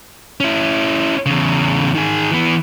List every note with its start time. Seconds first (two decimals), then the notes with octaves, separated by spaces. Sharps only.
0.40 C#4 E4
1.26 E2 C#3
1.95 D#3 G#4
2.31 E3 B3